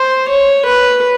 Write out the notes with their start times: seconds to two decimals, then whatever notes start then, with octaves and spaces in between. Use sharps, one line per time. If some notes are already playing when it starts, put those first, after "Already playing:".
Already playing: C5
0.29 C#5
0.67 B4